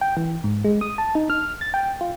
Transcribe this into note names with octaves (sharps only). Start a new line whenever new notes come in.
G5
E3
G#2
G#3
D#6
A5
D#4
F6
A6
G5
F4